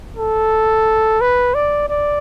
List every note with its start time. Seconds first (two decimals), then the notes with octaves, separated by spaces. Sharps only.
0.17 A4
1.21 B4
1.54 D5
1.89 D5